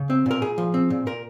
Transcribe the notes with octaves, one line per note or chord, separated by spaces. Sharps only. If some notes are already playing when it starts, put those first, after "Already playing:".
Already playing: C#3
C4
A#2 A#4
A#2 G#4
F3
C4
A#2
A#2 A#4